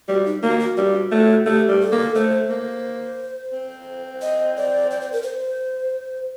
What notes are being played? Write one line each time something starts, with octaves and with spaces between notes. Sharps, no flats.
G3 F#4
D#4
A#3 F#4
F#4
G3 F#4 G4
A3
A3 G4
G3
A4
A#3
A3 C5
A#3
C4
D#5
D5
D5
C5
A#4
C5